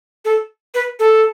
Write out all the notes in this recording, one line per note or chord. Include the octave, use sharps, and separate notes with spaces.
A4
B4
A4